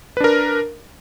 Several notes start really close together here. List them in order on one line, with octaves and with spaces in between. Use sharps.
B4 D4 A#4